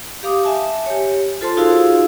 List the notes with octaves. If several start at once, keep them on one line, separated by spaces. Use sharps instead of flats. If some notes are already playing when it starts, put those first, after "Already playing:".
G4 F5 D6 D#6
E5 G#5 A5
G4 C#5
F4 A4 C5 A5 C6
D#4 F4 F#4 G#4 F5 E6